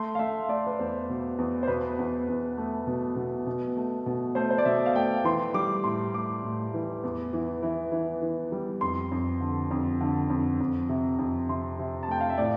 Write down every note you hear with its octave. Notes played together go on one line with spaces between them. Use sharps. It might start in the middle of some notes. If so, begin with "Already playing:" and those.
Already playing: A3 C6
F5
A3 E5
A3 D5
B4
E2 C5
B2
E2
C5
B2 B4
E2
E2
A3
B2
B2
B2
A3
B2
A3 C5
C5
D5
B2 E5
F5
A3 G5
E3 C6
G3 D6
A2 C6
A2 D6
A2
E3
E2
E3
E3
E3
E3
G3
F2 C6
F2
D3
F2
D3
F2
F2
C3
F2
C3 C6
C3
A5
A3 G5
F5
E5
A2 D5